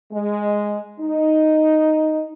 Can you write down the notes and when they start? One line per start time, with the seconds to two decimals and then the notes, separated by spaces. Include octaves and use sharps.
0.12 G#3
1.00 D#4